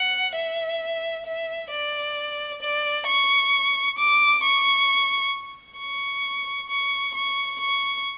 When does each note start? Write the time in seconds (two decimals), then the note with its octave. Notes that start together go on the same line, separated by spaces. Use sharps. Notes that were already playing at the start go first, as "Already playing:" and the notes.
Already playing: F#5
0.35 E5
1.26 E5
1.71 D5
2.62 D5
3.07 C#6
3.98 D6
4.43 C#6
5.79 C#6
6.69 C#6
7.15 C#6
7.60 C#6